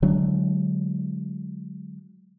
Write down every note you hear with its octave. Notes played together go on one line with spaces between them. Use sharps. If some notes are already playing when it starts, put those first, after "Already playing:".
D3 F#3 G#3 D4